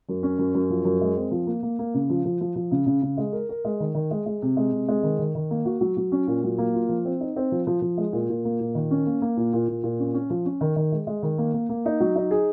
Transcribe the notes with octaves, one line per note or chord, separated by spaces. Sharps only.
F#2
C#4
F#2
F#2
F3
F#2
G#3
C4
F3
A#3
A#3
A#3
C#3
F3
F3
F3
F3
C#3
C#3
C#3
G#3
A#4
A#4
G#3
D#3
D#3
G#3
G#3
C3
G#3
C3
G#3
D#3
D#3
D#3
A#3
F#4
F#3
F#3
C#4
A#2
F#3
A#3
F4
F3
C4
D#4
C4
F3
F3
F3
G#3
A#2
A#2
A#3
A#2
D#3
C#4
A#3
A#3
A#2
A#2
A#2
A#2
C#4
C#4
F3
C#4
D#3
D#3
G#3
G#3
D#3
A#3
A#3
A#3
D#4
F#3
D#4
G#4